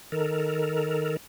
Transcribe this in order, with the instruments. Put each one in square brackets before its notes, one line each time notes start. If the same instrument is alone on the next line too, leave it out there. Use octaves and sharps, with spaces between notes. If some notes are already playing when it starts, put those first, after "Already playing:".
[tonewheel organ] D#3 A4 A#4